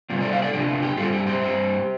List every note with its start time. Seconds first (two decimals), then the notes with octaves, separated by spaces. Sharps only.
0.10 C3 G3 C4 F4
0.20 A4 D5
0.32 C5 F5
0.42 A4 D5
0.53 C3 F3 D4 G4
0.68 F4
0.82 G4
0.97 G2 G3 C4 F4 A4
1.13 G4
1.27 G4 C5
1.41 G2 G3 C4